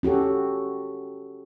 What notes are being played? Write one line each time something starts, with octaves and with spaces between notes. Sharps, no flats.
C#4 F#4 G4 A4